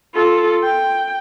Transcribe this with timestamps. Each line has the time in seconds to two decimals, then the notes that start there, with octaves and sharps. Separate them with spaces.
0.15 F4 A4
0.63 G5